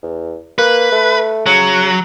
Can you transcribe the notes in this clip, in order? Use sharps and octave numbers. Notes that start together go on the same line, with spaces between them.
E2
A#3 B4
A3
C#3 F#3